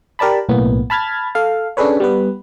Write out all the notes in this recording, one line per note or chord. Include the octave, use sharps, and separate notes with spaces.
G4 A#4 D5 A5 B5
B1 A2 A#3 B3
A5 B5 F6 G#6 A6
A4 F5
C#4 D4 G#4 A4 B4 C#5
G3 B3 B4